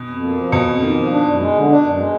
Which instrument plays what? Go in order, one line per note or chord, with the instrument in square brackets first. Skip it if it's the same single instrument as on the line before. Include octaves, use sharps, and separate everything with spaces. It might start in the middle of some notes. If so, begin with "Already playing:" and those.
Already playing: [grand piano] B2
[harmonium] F2
A#3
F3
[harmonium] F2 [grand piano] B2
[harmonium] F2
[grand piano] D#3 [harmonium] A#3
[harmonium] F3
D4
F#2
G#3
D3
D4
F#2
G#3